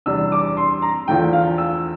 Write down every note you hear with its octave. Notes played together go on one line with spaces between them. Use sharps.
E2 C3 G3 D4 E6
D6
C6
A#5
E2 D3 F3 A3 G5
F5
E6